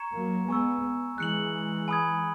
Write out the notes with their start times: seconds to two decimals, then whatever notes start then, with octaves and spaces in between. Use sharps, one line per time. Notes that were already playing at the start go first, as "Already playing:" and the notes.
Already playing: A#5 C#6 G#6 C#7 E7
0.14 F#3 A#3
0.48 G#3 B3 G#5 C#6 E6
1.18 E3 G#3 F#6 C#7 F#7
1.88 G#5 B5 D#6 G#6